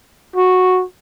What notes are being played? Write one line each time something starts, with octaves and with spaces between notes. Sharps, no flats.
F#4